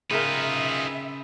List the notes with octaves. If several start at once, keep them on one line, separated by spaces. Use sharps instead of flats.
C#3 D#4 F4 G#4 A#4 B4 E5 G5